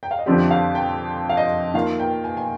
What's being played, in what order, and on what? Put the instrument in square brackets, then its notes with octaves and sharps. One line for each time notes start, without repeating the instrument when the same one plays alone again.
[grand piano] G5
F5
D#5
[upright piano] F2 D3 F3 C4 G4 [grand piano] D5
[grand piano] F5
G5
F5
D#5
[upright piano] D#3 A#3 F4 [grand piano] F5
[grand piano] G5
G#5
G#5